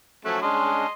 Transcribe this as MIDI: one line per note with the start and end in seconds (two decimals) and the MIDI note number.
0.25 0.39 53
0.25 0.41 54
0.25 0.41 57
0.25 0.41 61
0.25 0.39 69
0.25 0.39 90
0.42 0.87 56
0.42 0.87 61
0.42 0.87 62
0.42 0.93 75
0.42 0.93 84